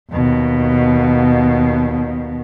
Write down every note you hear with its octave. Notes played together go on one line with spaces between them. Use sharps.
D#2 B2